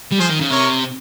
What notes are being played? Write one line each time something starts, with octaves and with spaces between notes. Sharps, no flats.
G3
F3 G#4 C5
D#3
C#3
C3 A#4 C#5